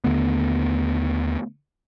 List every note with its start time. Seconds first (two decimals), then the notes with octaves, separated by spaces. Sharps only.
0.04 D#2 D3 A3 B3